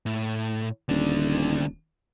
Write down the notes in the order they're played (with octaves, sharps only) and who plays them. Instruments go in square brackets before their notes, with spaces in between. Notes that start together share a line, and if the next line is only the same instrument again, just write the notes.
[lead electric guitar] A2
[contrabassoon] D#1 [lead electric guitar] D2 D4